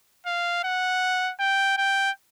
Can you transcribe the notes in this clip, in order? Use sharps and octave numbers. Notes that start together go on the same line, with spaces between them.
F5
F#5
G5
G5